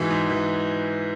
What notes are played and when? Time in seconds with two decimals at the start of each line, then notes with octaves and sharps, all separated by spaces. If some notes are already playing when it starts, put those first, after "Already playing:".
Already playing: G#2 E3 F#4 G#4
0.10 G#2
0.30 E3